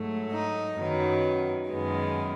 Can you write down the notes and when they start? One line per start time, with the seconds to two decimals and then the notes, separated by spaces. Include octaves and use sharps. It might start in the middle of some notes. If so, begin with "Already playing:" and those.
Already playing: G#2 F#3 A3
0.31 D#4
0.76 F#2 D#3 F#3 B3
1.69 F#2 D#3 G#3 B3